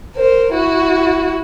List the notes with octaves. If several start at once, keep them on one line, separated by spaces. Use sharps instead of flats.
A#4 C5
E4 F#4